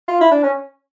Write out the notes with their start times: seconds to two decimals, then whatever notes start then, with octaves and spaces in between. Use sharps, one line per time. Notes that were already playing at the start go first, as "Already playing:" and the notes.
0.08 F4
0.21 E4
0.32 D4
0.44 C#4